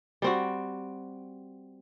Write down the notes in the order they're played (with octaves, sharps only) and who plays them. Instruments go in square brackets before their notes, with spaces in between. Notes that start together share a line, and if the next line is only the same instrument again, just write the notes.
[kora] G3 C4 F#4